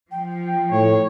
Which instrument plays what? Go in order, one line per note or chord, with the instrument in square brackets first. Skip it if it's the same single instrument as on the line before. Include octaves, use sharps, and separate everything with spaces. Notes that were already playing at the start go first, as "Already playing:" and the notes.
[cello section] F3 [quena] G5
[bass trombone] A2 [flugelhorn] C#5